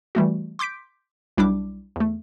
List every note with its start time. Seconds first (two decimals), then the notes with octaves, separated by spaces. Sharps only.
0.15 E3 G3 A3 F#4
0.59 C6 D6 G6 B6 D7
1.38 B1 G3 D4 E4 D6
1.96 E2 A3